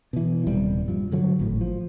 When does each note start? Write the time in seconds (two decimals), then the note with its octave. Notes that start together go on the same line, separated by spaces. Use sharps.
0.13 B2 E3
0.47 D#1 D#2 C3 G3
0.88 G2 F3
1.11 G2 D3 F#3
1.39 G#1 A2
1.61 F3